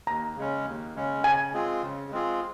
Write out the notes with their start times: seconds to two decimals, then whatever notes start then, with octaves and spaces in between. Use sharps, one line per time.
0.07 D#2 A#5
0.36 C#3 G#3 C#4
0.65 D#2
0.95 C#3 G#3 C#4
1.24 C#3 G#5
1.53 G#3 C4 F4 G#4
1.82 C#3
2.11 G#3 C4 F4 G#4